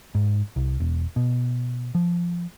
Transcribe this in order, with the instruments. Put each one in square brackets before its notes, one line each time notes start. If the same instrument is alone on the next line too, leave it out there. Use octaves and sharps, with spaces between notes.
[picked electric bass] G#2
C2
E1
B2
F3